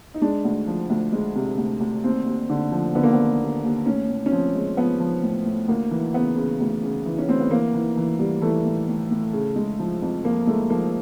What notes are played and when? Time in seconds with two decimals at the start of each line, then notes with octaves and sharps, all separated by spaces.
0.14 D#4
0.21 G#3 D4
0.45 D2
0.67 F3
0.90 D2
1.13 G#3
1.36 C3
1.58 D2
1.80 D2
2.04 D#2 C4
2.26 D#2
2.49 D3
2.72 F3
2.95 D3 B3
3.03 A#3
3.13 D#2 B3
3.41 D#2
3.64 D#2
3.86 A2 C#4
4.09 A2
4.26 C#4
4.32 F3 C4
4.55 G#3
4.77 F3 B3
5.00 F3
5.23 A2
5.46 A2
5.68 D2 A#3
5.91 E3
6.14 C#3 B3
6.37 C#3
6.60 D2
6.83 C#3
7.06 E3
7.18 C#4
7.29 D2 C4
7.40 B3
7.51 E3 A#3
7.74 E3
7.97 E3
8.19 G3
8.42 E3 A3
8.65 A2
8.88 A2
9.11 A2
9.33 C#3
9.56 G#3
9.80 F3
10.02 F2
10.24 F3 A#3
10.47 G#3 A3
10.70 F3 A#3